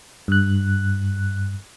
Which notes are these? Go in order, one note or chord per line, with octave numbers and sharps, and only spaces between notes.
G2 F#6